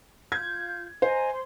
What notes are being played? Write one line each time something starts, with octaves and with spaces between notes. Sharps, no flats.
F4 G6 G#6
C5 D#5 G#5 A#5
C5 C6